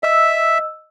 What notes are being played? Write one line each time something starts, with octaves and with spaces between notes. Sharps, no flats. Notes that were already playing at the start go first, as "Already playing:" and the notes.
D#5 E5 E6